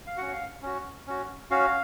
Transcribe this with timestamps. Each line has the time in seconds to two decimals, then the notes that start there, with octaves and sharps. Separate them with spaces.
0.07 F5
0.17 C#4 F#4 F#5
0.32 F5
0.62 C#4 F#4
1.07 C#4 F#4
1.51 C#4 F#4 F5